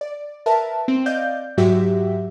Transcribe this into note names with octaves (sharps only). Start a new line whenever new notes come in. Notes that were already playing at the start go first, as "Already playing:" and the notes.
D5
A#4 B4 E5 A5
C4
D5 D#5 F5 G6
G#2 F#3 F#4 G4 E5